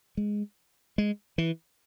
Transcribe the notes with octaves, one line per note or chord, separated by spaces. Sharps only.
G#3
G#3
E3